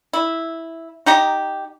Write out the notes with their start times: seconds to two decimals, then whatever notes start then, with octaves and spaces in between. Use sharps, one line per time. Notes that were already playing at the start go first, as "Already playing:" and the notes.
0.13 E4
1.06 D#4 G4 A#5